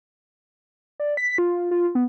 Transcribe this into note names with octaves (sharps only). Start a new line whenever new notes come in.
D5
B6
F4
F4
B3